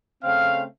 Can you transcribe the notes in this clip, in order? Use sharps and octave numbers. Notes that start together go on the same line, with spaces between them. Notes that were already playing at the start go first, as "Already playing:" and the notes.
C#3 A3 C4 F5